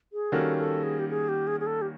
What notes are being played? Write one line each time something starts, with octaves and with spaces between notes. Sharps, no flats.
G#4
D#3 G3 A#3 C#4 F#4 A4
A4
G#4
G4
G#4
G4
G#4
G#4
A4
G4